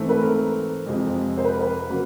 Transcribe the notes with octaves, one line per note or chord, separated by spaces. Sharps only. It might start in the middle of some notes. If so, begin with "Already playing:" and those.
Already playing: G#2 E3 A3 C4
B4
A#4
F2 C3 F3 G#3 C4
C5
B4
A#4
B4
C#3 F#3 A#3